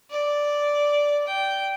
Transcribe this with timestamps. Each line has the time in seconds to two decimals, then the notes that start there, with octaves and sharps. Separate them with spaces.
0.11 D5
1.27 G5